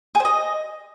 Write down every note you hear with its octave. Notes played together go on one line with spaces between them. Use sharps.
G#4
C5
D#5